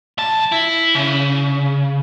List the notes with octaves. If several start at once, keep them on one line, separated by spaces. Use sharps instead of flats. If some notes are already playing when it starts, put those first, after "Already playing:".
B1 A5
E4
C#3